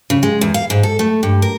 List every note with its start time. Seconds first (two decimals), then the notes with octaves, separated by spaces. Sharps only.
0.10 C#3
0.23 G#3
0.41 E2
0.54 F5
0.70 G#2
0.83 A4
0.99 A3
1.23 G2
1.42 A#4